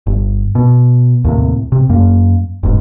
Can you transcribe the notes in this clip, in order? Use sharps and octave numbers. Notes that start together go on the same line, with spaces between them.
G1
B2
D#2 A2 C3
C3
F#2 A#3
E1 A1 G#2